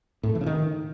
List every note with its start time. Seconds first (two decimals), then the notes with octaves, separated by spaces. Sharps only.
0.23 A2
0.29 A3
0.35 E3
0.41 C#3
0.46 D#3